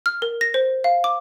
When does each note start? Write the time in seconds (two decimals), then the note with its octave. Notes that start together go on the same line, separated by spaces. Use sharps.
0.06 F6
0.22 A#4
0.41 A#6
0.54 C5
0.84 F5
1.04 D6